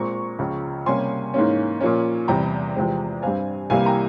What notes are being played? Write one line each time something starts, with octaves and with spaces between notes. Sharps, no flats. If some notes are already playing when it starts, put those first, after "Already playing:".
Already playing: A#2 G#3 C4 A#5 C#6
C#2 C#3 F3
C3 G3 A#3 C#4 G#5 C6
G#2 E3 A#3 C#4
A#2 F3 A#3 C#4
E2 C3 G3 G5 A#5
E2 C3 F3 G#3 C4
G2 G3 C4 F5 G#5
C2 C3 E3 G3 A#3 F5 G#5
G5 A#5